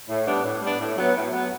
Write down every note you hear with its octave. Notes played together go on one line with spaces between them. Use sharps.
A2
G3 B3 D4
A2
G3 B3 D4
A2
F#3 B3
A2
F#3 B3